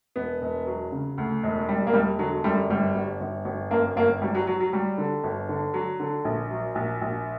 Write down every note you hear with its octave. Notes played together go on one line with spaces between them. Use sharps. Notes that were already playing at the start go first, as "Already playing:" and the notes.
E1 B3
E1
F#3
C#3
D2
E1
E1 G3
A#3
E1 G3
D3 F#3
F#2 G3
G1 G3
G1
G1
G1
F#2 A#3
G1 A#3
F#3 G3
F#3
F#3
F#3
F#3 G3
D3
G1
D3
F#3
D3
A#1
F#3
A#1
A#1